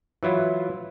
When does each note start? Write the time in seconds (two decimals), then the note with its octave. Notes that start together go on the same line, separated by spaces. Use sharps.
0.23 E3 F#3 E4 F4